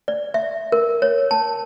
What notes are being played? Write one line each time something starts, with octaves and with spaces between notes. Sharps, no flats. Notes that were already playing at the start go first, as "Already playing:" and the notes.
D5
E5
A#4
C#5
A5